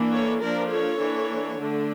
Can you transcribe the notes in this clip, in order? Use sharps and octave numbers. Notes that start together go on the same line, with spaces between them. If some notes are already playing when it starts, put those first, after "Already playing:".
Already playing: E3 A#3 D4
A4 C#5
F3 A#3 D4 A#4 D5
A4 C#5
E3 A#3 D4
D3 A3 D4